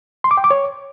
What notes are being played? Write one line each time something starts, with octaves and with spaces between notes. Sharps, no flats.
C6
D6
G5
D6
C#5